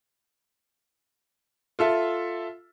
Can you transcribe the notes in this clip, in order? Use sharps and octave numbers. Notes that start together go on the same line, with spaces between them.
F4 A4 E5